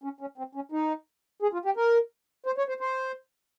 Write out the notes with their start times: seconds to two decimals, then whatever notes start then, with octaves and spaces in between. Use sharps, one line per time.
0.04 C#4
0.21 C#4
0.38 C4
0.55 C#4
0.72 D#4
1.42 G#4
1.53 F4
1.65 G4
1.77 A#4
2.46 C5
2.58 C#5
2.69 C5
2.81 C5